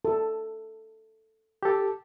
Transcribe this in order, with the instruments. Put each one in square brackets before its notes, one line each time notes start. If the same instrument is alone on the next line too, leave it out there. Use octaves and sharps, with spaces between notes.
[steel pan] A4
[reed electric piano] G4 A4